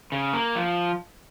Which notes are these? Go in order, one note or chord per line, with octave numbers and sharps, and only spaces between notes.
C#3
A#3
F3